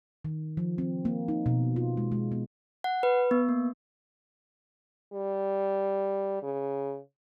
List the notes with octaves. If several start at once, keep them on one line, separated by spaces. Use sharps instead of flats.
D#3
F3
C4
A#3
D#4
B2
F4
G#3
G#3
B3
F#5
B4
B3
A#3
G3
C#3